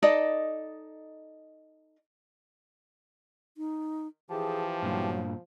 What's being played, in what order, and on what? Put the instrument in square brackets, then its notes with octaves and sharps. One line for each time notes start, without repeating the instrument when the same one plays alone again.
[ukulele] D#4 A4 D5 D#5
[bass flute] D#4
[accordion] E3 G4 A5 [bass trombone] F3 [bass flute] G#4
[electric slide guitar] G2 A#2 [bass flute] F#3